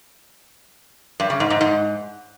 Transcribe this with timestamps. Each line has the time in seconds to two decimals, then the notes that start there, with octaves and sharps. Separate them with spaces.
1.20 G2
1.30 C#3
1.40 G#2
1.50 G#2
1.61 G#2